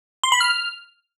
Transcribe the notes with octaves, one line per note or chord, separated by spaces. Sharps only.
C6
B5
F6